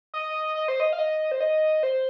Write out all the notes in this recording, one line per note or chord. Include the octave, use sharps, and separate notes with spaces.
D#5
D#5
C5
D#5
F5
D#5
C5
D#5
C5